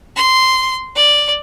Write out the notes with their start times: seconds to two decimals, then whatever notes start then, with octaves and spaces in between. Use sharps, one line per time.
0.16 C6
0.96 D5